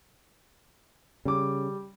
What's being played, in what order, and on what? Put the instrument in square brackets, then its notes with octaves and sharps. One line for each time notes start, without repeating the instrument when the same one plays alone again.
[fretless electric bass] C#3 [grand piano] G3 D6